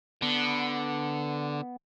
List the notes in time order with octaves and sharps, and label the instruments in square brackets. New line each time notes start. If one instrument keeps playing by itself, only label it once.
[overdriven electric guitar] D3 [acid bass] B3